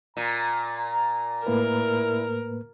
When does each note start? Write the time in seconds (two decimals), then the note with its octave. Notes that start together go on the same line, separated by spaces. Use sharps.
0.17 A#2 A#5
1.47 A2 A#3 E4 A#4 B4